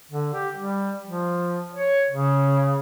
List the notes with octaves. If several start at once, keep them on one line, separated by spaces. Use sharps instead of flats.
D3
G4
G3
F3
C#5
C#3